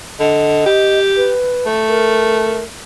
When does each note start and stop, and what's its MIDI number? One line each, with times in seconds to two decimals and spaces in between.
0.20 0.63 50
0.20 0.99 75
0.66 1.34 67
1.17 1.66 71
1.66 2.64 57
1.89 2.64 70